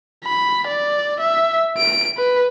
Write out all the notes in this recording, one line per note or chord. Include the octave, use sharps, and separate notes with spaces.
B5
D5
E5
D7
B4